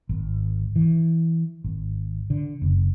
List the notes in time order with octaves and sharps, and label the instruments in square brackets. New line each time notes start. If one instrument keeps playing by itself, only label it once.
[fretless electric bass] G#1
E3
G#1
D3
F#1